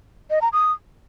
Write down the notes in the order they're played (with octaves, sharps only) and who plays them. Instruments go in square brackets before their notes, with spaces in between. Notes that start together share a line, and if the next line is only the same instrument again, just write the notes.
[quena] D#5
A#5
D#6